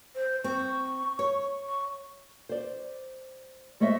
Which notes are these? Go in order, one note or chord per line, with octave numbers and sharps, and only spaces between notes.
C5
C4 C#6
C#5
C#6
C5 D5
G#3 A3 C5 C#5 D#5 E5